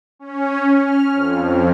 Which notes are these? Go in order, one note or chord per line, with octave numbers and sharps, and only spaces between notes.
C#4
F6
F2